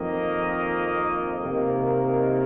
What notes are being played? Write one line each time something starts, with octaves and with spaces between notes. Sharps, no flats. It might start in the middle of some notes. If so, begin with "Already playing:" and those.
Already playing: F2 D#3 A#3 D#5
C3 D#3 A#3